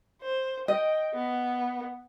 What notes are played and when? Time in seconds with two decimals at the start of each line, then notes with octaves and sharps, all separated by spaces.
0.22 C5
0.68 D#5 G5
1.14 B3